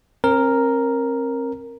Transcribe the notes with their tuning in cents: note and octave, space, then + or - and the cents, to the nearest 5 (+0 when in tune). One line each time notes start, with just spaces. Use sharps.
C4 +40 A#4 +0